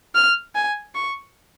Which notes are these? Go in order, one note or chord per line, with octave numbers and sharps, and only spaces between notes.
F6
G#5
C#6